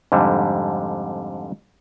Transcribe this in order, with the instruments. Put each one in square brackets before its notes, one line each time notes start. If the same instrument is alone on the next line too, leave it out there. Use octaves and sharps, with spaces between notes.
[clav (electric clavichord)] F2 G#2 D3 G3